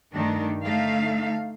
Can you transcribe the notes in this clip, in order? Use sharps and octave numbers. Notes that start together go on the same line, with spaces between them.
G2 D#3 A3 D4
D3 A3 D#4 E5 F5